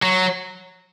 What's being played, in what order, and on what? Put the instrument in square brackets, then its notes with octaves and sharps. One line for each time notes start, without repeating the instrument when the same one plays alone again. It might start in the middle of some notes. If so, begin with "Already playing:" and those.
[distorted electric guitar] F#3